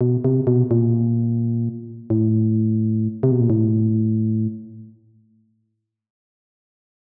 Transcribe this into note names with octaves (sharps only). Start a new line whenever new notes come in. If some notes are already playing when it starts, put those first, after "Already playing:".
B2
C3
B2
A#2
A2
C3
B2
A#2
A2